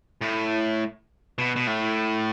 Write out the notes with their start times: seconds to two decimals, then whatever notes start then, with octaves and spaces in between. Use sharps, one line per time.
0.21 A2
1.38 B2
1.56 B2
1.67 A2